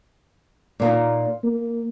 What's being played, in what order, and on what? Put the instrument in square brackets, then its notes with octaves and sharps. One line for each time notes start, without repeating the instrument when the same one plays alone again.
[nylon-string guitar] A#2 A#3 D#4
[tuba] A#3